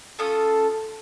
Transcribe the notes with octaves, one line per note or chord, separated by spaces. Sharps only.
C#4 F4 A4 D#6